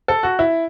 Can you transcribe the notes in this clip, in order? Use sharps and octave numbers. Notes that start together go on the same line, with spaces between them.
A4
F#4
E4